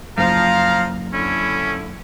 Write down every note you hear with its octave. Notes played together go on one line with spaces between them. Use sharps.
F#1 F3 F5 A#5
D3 C#4 E4